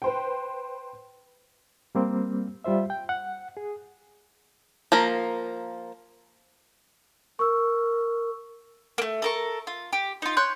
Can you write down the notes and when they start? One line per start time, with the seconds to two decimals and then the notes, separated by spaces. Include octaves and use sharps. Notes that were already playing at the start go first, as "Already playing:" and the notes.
0.02 B4 C5 G5
1.95 G3 A#3 C4
2.64 G3 F4 C5 E5
2.90 G5
3.09 F#5
3.57 G#4
4.92 F3 A#3 A#4
7.39 A#4 C#6 E6
8.98 A3 A#3
9.22 A4 A#4 C#6
9.67 F4
9.93 G4
10.22 D#4 F4
10.37 C#5 C6 F#6 G6